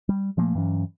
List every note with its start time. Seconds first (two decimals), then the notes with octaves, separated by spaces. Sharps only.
0.09 G3
0.37 A#2 F3 A3 A#3
0.55 G2 E3 F#3 C#4